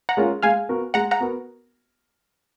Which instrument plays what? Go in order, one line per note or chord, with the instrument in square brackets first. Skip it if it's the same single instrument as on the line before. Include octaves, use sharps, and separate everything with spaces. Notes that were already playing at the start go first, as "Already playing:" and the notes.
[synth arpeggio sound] F#5 A#5
[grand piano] G#3 C#4 F4 A#4
[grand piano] G#3 [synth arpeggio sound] F5 G#5
[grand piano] B3 F#4 A#4
[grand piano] G#3 [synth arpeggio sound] F#5 A#5
[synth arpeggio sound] F#5 A#5
[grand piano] B3 F#4 A#4